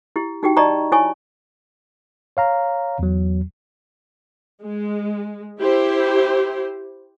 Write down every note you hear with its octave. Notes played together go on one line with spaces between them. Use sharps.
E4 G4
D#4 F#4 G4 G5
D5 D#5 A5 A#5 C#6
E4 C#5 G#5 C#6
C#5 F5 A#5
E2 F#3
G#3
E4 G4 C5